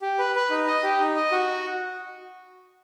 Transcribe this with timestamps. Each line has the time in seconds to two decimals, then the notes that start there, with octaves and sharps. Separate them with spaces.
0.02 G4
0.19 B4
0.35 B4
0.50 D#4
0.67 D#5
0.83 G4
1.00 D#4
1.16 D#5
1.32 F#4